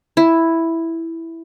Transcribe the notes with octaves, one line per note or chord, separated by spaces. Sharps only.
E4